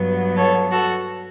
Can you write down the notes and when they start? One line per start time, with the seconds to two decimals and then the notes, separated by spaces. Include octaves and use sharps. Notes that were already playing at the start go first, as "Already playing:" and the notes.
Already playing: G2 F#3 B3
0.36 A4 C#5
0.72 F#4 A4